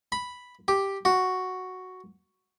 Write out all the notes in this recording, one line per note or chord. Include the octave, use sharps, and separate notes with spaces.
B5
G4
F#4